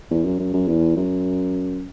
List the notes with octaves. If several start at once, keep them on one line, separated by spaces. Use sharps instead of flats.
E2
F#2
F#2
F#2
E2
F#2